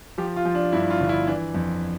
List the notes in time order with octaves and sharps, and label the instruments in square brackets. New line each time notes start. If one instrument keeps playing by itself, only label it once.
[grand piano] F3 G4
F4
F3
D4
G2 E4
F4
G1
E4
E3 D4
F2